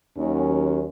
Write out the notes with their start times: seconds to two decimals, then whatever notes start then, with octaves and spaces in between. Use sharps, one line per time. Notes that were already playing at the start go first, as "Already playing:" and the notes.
0.18 D#2 F#3 C#4